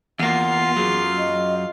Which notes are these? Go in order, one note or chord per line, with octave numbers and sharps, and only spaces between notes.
E2 A#3 F4 F5 F#5
F#2 F#3 G#4
D#5